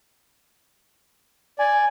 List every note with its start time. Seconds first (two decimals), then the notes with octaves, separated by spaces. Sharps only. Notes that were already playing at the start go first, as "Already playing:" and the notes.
1.59 D5 G#5